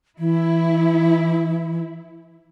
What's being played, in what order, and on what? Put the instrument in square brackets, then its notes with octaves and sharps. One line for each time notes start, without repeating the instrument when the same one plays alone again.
[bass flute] E3 [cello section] E4